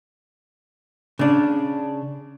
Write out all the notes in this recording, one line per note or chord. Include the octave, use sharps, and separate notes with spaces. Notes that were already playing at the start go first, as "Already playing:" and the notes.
C#3 D4